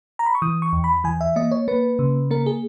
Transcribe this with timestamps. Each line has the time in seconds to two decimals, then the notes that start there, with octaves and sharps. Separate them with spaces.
0.19 A#5
0.26 B5
0.35 C#6
0.42 E3 D#6
0.62 C#6
0.73 E2
0.84 B5
1.04 E3 G#5
1.21 E5
1.36 A#3 D#5
1.51 C#5
1.68 A#3 B4
1.99 C#3
2.31 A#3 A#4
2.46 G#4